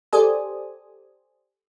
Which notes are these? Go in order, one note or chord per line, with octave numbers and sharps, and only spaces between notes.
G4 A4 C5 D5 G#5 D#6